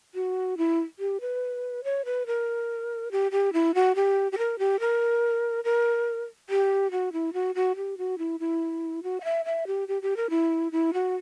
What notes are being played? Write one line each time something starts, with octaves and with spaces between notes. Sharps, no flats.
F#4
E4
G4
B4
C#5
B4
A#4
G4
G4
E4
F#4
G4
G4
A#4
G4
A#4
A#4
G4
F#4
E4
F#4
F#4
G4
F#4
E4
E4
F#4
F#5
E5
E5
G4
G4
G4
A#4
E4
E4
F#4